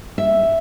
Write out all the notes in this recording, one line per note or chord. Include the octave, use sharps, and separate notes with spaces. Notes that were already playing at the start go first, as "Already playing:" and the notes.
E5